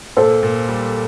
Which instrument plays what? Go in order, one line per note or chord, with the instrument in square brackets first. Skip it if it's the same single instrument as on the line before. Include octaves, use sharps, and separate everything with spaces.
[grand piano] A#2 [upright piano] A4 C5
[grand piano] A#2
G3